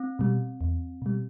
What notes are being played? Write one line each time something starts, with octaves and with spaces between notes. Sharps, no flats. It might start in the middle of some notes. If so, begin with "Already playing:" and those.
Already playing: C4
B2 G3
E2
B2 G3